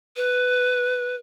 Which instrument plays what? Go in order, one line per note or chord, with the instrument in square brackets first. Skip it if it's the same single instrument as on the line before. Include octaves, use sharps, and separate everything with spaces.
[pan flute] B4